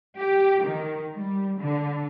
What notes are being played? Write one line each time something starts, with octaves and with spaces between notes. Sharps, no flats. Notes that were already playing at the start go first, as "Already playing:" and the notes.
G4
D#3
G3
D3